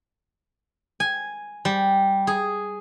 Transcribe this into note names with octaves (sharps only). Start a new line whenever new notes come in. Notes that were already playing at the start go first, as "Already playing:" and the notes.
G#5
G3
G#4